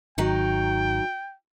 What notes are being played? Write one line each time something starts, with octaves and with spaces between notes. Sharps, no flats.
G#1 D#3 F#3 D#4 G5